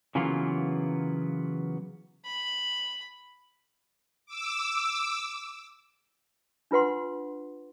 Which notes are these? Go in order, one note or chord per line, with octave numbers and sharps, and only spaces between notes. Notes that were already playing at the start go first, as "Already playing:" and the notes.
C#3 E3 F#3 A#3 B3 F4
B5
D6 E6
D4 F4 B4 F#5 C6